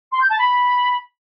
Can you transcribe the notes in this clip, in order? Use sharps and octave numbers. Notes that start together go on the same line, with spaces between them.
C6
G6
A5
B5